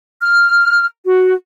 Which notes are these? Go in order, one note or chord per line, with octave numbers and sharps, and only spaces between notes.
F6
F#4